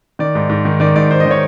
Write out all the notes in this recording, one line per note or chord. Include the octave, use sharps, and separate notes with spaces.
D#3 D5
G#2
G#2
D#3
D#3 D5
G#2 D5
G#2 C5
D#5
D#3 C#5